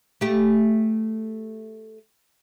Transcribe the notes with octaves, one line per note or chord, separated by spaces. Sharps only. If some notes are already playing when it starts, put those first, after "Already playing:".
A3 G4